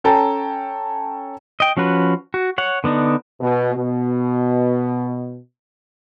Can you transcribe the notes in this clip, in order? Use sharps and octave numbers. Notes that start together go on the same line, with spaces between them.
C#4 A4 G5 A5 A#5
D#5 G5
F3 C#4 F#4 B4
F#4
C#5 F#5
D3 B3 D4 D#4
B2
B2